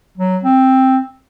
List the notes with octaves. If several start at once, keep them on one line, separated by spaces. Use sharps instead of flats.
F#3
C4